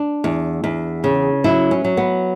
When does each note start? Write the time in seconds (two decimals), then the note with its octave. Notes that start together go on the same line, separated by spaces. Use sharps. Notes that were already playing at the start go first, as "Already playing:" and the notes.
Already playing: D4
0.24 E2
0.64 E2
1.04 C#3
1.44 F#3 E4
1.71 C#4
1.84 F#3
1.97 B3